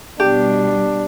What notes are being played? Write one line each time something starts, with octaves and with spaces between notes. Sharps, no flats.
B2 G3 D4 G4